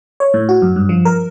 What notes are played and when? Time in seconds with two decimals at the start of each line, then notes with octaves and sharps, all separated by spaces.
0.20 C#5
0.34 A2
0.49 F#4
0.62 F#2
0.76 G2
0.89 F3
1.05 A#4